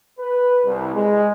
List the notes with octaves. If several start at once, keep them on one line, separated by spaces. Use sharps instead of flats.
B4
C2
G#3